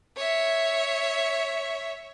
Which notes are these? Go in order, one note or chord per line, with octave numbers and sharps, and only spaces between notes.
C#5 E5